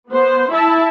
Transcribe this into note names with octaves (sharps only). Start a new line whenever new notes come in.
B3 C5
E4 E5 A5